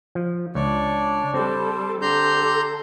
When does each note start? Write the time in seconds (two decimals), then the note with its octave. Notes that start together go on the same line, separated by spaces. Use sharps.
0.15 F3
0.55 C#2 D4 C#5 D5
1.34 G3 C4 A4 C5
2.02 D3 G4 A4 A#5 C6 G6